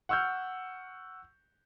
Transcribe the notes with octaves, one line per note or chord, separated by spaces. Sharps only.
F#5 C#6 E6 F6 G6